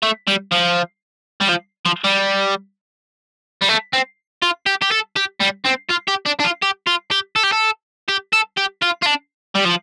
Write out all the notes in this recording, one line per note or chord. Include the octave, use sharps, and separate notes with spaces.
A3
G3
F3
G3
F3
F3
G3
G3
A3
C4
F4
G4
G4
A4
G4
G3
C4
F4
G4
D4
D4
F4
G4
F4
G4
A4
G4
A4
G4
A4
G4
F4
F4
D4
G3
F3